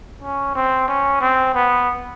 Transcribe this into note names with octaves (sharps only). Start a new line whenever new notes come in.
C#4
C4
C#4
C4
B3